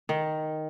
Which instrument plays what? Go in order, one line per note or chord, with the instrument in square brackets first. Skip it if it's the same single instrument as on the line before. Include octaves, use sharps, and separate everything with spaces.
[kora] D#3